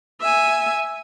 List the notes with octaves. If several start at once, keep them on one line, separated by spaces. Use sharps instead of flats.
E5 G#5